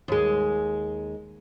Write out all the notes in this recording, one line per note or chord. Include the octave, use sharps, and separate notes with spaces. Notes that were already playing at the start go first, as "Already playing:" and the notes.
D#2 G#3